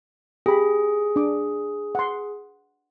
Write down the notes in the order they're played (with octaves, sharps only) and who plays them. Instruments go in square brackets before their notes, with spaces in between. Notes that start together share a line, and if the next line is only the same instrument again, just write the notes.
[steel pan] G4 B5 [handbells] G#4
[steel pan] D4 D6
F#5 C6